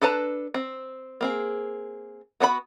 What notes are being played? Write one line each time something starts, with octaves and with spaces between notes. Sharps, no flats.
D4 A4 B4 A5 A#5
C4
A#3 C4 G#4
B3 F#4 D5 B5